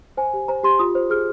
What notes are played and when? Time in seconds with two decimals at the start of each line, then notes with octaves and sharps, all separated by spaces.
0.17 C5 G#5
0.33 G4
0.48 C5 A#5
0.63 G4 C6
0.79 F4 D#6
0.95 C5
1.10 G#4 F6